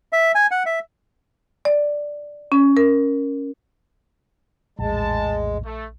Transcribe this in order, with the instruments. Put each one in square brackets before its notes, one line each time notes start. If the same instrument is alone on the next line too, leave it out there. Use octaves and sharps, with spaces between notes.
[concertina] E5
G#5
F#5
E5
[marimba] D5
C#4
A#4
[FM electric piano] A#1 [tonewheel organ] E2 A2 [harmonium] G#3 [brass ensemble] A5
[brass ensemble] A3